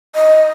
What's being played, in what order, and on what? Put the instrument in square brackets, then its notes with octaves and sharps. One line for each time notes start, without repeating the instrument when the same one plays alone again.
[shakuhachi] D#5